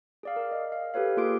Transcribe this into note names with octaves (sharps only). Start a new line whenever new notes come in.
G#4 D5 F5
A#4
D#5
F5
G4 A4 B4 C#5 F5
A#3 F4 G#4 C6 D6 D7